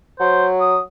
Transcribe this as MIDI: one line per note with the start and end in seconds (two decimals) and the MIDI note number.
0.20 0.79 54
0.20 0.46 72
0.61 0.80 87